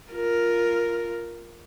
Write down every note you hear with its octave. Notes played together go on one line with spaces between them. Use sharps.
F4 A#4